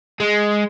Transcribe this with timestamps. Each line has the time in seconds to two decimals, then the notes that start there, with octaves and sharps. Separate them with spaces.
0.20 G#3